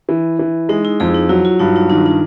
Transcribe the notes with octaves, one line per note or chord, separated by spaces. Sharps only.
E3
E3
G#3 D#4
E4
F2 G#4
D#4
F#3 E4
F4
G2 D#4
D#4
D#3 D4
D4